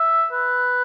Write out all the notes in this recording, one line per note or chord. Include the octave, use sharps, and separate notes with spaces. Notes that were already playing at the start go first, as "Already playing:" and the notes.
Already playing: E5
B4